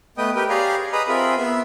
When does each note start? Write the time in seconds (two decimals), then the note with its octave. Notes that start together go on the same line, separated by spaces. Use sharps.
0.18 A3 B3 B4 D#5 G5 D#6
0.36 G4 A#4 B4 G5
0.49 G4 G#4 C#5 D5 F5 A#5
0.93 G#4 B4 D#5 A#5 B5 D#6
1.08 C4 F4 G#4 A#4 E5 B5
1.37 B3 E5